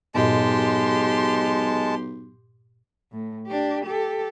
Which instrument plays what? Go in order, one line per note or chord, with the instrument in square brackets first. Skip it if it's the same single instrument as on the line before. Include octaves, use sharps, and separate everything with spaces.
[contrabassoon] B1 [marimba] G2 A#2 D#5 [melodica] G#3 A5 [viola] G4 C6
[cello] A2
D4 G4
G4 A4